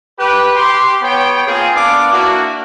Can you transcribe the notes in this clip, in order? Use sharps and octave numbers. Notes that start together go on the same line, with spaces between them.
G4 B4
G4 C6
B3 C#5 G5
A#3 C4 F4 G#4
B3 D4 D5 F5 D6
A#3 D4 E4 F#4